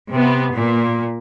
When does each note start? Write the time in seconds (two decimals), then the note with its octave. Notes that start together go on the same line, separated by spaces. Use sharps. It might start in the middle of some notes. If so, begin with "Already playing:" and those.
0.11 C3 B3
0.53 A#2